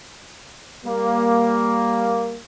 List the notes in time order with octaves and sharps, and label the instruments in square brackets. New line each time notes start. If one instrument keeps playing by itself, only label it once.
[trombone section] G3 A#3